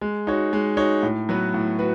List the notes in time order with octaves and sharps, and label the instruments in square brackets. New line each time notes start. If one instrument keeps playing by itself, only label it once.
[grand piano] G#3
D#4 F#4 C#5
G#3
D#4 F#4 C#5
A2
F#3 B3 F#4 B4
A2
F#4 B4